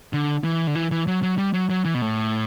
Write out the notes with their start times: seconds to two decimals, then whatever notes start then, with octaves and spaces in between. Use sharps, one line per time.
0.13 D3
0.44 E3
0.67 D3
0.75 E3
0.91 E3
1.07 F#3
1.23 F#3
1.38 G3
1.54 F#3
1.70 F#3
1.85 E3
1.94 B2
2.02 A2